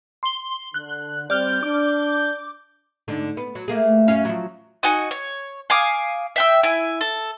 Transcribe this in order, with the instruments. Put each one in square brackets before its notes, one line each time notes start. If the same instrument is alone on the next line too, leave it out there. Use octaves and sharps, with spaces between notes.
[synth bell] C6 G7
[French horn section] D3 [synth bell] F#6
[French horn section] G3 C4 [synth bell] D5 F6 [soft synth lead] G6
[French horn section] D4 [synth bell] D6
[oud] G#2 D3 D4
B3
F#3
A3 A#3 G#4
F#2 C#4 F5
F3 F#3
[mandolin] D#4 F#4 G#5
C#5
F5 G#5 D6 D#6
E5 G5 E6
E4 G#5
A4